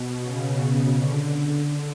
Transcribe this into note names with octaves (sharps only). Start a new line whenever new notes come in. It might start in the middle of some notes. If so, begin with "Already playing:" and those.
Already playing: B2
C#3
D3